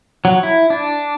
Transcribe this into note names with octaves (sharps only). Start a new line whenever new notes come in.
F#3
E4
D4